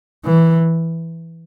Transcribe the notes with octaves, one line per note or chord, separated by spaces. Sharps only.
E3